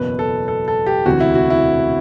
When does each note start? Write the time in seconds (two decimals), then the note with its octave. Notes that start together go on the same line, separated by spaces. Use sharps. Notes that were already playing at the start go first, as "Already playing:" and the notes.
Already playing: F#1 E2 B2 B4
0.19 A4
0.48 A4
0.68 A4
0.86 G4
1.06 E1 D2 C3 E3 F#4
1.20 E4
1.35 F#4
1.50 E4